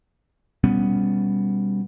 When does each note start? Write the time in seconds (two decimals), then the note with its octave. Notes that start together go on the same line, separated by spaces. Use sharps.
0.64 B2 G3 B3 C#4